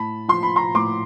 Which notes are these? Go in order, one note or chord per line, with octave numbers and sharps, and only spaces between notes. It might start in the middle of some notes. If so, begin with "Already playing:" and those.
Already playing: A2 A5 B5
F3 C6
B5
A#5 C6
A2 C6 D6